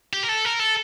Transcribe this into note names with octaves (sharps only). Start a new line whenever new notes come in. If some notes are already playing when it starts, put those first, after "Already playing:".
G4
A#4
A4
A#4
A4